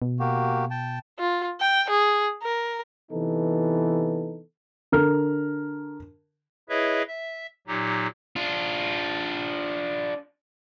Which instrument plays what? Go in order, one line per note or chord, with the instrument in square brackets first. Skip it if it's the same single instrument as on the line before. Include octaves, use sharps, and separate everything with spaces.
[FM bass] B2
[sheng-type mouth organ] A#3 F#4 G4
G5 A5
[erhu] F4
G5
G#4
A#4
[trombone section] C3 E3 B3 D#4 A4
[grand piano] D3 A#4 F6
[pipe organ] E4 G#4 B4 C#5 D#5 E5
E5
A#2 F#3 D#4 G4
[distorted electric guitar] D4 F4